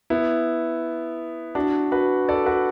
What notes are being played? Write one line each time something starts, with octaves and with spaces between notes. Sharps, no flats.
B3 E4
D4 F#4
F#4 B4
A4 D5
F#4 B4